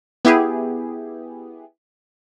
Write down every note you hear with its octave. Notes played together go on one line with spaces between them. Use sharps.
B3 E4 G4 G#4